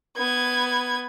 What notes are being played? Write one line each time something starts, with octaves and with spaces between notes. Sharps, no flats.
B3 G#6